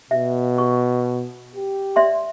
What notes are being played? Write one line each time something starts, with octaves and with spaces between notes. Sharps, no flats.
B2 E5
C#6
G4
D5 E5 C6